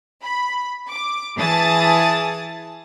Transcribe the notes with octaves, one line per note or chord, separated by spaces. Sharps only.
B5
D6
E3 G#4 A5 D#6 A6